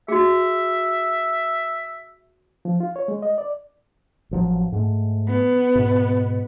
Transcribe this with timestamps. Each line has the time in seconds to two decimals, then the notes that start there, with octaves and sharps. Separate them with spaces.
0.08 F#4 G#4 E5
2.65 F3
2.80 F4
2.96 C#5
3.08 G#3
3.22 D#5
3.38 D5
4.31 A1 F3 F#3
4.72 G#2 A3
5.27 B3
5.75 G#2 B2